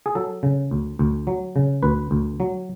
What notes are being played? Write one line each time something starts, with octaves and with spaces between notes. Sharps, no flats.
G#4
F#3 A4
C#3
D2
D2
F#3
C#3
D2 B4
D2
F#3